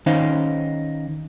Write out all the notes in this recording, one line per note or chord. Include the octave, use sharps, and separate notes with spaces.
D#3 C#4 D#4 C5 F5